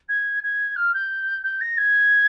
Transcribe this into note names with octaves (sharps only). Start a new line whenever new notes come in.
G#6
G#6
F6
G6
G6
A#6
G#6